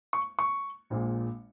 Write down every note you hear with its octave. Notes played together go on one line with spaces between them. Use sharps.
C#6
C#6
A#1 A#2 G#3